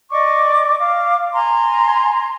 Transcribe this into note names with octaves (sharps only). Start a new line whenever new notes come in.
D5 D#5 C#6 D6
F5 D6
G#5 A#5 C6